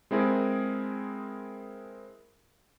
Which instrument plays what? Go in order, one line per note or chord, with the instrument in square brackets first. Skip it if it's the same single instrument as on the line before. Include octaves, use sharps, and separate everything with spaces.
[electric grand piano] G#3 C4 E4 G#4 A#4